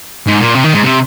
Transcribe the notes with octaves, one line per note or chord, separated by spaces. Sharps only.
G#2
A#2
C3
D#3
G#2
C3